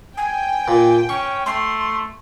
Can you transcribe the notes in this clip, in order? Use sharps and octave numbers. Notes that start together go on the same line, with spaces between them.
G5 G#5
A#2
C#4 C#6
A3 C6